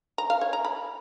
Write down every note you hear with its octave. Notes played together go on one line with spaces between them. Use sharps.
A#5
F5
C#5
A#5
B5